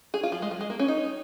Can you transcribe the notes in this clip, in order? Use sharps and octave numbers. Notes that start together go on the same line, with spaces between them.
G#4
F4
F3
G#3
F3
G#3
A#3
C#4
D#4